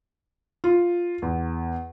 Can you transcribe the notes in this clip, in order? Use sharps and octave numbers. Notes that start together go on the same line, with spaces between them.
F4
E2